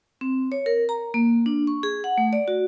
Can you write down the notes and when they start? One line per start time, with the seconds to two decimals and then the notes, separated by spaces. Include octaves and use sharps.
0.21 C4
0.52 C#5
0.66 A#4
0.89 A#5
1.14 A#3
1.46 D4
1.67 C#6
1.83 G#4
2.04 F#5
2.18 A3
2.33 D5
2.48 F#4